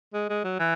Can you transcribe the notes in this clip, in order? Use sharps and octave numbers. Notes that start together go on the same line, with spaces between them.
G#3
G#3
F#3
E3